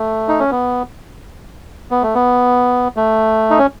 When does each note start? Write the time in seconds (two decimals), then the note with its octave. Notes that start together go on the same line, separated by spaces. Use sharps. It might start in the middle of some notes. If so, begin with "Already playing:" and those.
Already playing: A3
0.28 D#4
0.39 C#4
0.51 B3
1.91 B3
2.03 A3
2.15 B3
2.97 A3
3.50 D#4
3.59 C#4